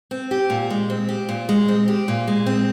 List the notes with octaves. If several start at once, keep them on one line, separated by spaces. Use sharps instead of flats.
C4
G4
A#2
G#3
C4
G4
A#2
G#3
C4
G4
A#2
G#3
C4